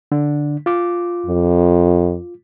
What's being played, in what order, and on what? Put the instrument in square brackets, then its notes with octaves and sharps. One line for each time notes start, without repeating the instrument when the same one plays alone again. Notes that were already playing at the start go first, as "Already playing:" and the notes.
[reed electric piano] D3 D4
F4 D6
[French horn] F2